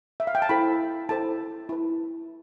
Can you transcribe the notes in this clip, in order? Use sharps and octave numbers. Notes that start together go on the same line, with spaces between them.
E5
F5
G5
A5
E4 A4 C5 B5
E4 A4 C5 A5
E4 B4